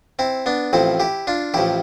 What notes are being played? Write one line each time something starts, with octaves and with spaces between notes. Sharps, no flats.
C4 E4
B3 D4
A1 A2 F3 C4 E4
E4 G4
D4 F4
A1 A2 F3 E4 G4